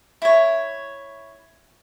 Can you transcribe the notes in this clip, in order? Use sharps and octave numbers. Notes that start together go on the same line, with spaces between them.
E4 C#5